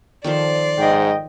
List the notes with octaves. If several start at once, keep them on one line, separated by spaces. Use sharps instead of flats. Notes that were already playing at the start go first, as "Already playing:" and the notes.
D#3 F3 A4 D5 C6
G#2 D#5 G5